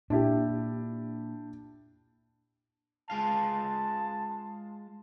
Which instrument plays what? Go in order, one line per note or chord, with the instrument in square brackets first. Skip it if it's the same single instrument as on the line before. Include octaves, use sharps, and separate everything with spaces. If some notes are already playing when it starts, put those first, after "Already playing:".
[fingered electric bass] A#2 [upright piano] D4 E4 G4
[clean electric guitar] G#3 F4 F5 [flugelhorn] A5